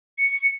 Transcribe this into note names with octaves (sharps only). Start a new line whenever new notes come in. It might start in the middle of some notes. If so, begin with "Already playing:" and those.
C#7